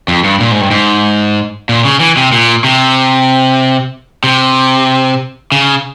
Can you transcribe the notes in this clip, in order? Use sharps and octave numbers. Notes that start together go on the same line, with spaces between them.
F2
G2
A#2
G#2
G2
G#2
A#2
C#3
E3
C3
A#2
C3
C3
C#3